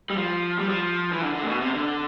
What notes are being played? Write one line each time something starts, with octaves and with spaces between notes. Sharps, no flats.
G3
F3
G3
F3
E3
D3
D3
A2
B2
C3
D3